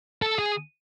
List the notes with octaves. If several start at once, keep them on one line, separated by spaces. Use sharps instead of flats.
A4
G#4